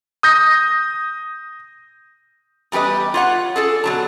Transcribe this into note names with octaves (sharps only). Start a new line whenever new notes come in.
D#6 G6 A#6
E2 G3 G4 B4 D#5
F4 C#5 F#5
G#4 A4 D5
B2 F#3 A5